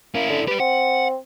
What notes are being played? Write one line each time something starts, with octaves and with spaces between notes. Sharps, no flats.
A#3 C#4 E4
D3
G4 B4 D5
C4 F#5